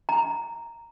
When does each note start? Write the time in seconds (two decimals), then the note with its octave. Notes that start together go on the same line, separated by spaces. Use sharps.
0.09 A#5